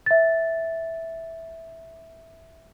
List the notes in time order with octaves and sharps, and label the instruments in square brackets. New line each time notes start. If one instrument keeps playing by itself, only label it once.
[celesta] E5 A6